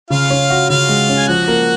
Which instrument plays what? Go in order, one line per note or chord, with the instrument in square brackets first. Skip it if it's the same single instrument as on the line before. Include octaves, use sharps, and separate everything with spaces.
[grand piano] C#3 [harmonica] F4 F5
[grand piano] C#4
F#4
[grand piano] C#3 [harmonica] F4 F5
[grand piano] G#3
C#4
[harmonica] G#5
[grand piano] F3 [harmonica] F#4 F#5
[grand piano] A#3